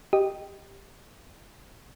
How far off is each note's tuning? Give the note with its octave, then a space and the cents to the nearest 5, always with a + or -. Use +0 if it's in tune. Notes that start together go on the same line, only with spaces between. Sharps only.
G4 +0 D#5 +0